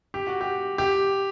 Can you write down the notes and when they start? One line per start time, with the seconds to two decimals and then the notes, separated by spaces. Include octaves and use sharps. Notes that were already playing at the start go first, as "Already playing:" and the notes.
0.14 G4
0.27 F#4
0.41 G4
0.78 G4